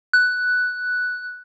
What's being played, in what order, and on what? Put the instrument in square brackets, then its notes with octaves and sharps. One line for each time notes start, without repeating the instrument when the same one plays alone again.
[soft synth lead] F#6